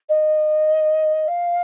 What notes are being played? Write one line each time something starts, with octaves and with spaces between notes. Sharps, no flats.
D#5
F5